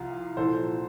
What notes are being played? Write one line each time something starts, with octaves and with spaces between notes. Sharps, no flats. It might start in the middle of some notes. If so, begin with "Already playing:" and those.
Already playing: C2 C3 F3 F4
C2 A#2 F3 A4 C5